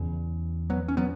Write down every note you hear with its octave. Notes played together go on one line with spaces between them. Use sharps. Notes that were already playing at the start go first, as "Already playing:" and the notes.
Already playing: E2 C#3
F#3 B3
C#4
F#3 B3